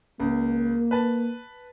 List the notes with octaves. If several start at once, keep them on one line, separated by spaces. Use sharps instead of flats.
C#2 A#3
B4 A5